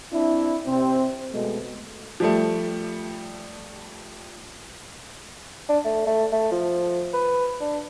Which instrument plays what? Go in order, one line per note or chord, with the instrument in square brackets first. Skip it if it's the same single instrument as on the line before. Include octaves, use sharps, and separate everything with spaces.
[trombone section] C4 D4 E4
C3 C4
B2 G#3 A3
[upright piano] F3 G3 A3
[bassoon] D4
A3
A3
A3
F3
B4
D4